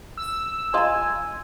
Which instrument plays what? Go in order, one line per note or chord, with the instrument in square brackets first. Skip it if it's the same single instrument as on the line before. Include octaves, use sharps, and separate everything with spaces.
[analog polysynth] E6
[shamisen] F4 D#5 [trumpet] G#5 [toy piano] A#5 C6